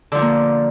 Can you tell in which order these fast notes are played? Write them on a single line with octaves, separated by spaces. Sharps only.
D3 F3 D4 A#3